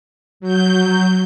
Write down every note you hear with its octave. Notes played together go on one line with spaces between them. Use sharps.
F#3 G6